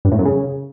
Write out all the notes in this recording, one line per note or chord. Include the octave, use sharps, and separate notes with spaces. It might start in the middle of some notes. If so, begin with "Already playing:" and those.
G2
A2
F#2
C#3